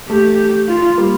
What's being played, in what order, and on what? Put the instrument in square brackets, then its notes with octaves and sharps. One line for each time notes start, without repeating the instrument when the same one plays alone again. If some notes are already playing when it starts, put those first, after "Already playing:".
[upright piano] A3 [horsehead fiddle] G4
[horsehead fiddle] F4
[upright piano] G3 A#3